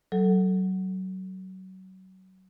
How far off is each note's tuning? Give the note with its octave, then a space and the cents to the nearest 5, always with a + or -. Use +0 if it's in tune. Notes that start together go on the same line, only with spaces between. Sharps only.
F#3 +25 A4 +0